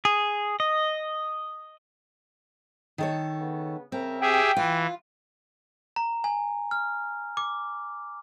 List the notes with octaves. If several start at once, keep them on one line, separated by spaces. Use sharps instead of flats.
G#4
D#5
D#3 A4 C#5
C#3 B3
C#3 C4 A#4 E5
G4 G#4 E5 G5
E3 F4
A#5
G#5
F6
D6